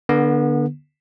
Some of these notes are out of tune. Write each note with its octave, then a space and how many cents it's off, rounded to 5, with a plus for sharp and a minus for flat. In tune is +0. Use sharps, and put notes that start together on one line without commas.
D3 +5 B3 -30